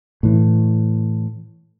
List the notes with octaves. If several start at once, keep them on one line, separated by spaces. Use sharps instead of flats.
A2 E3